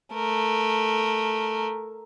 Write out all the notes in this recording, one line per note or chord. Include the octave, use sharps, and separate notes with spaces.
A3 A#4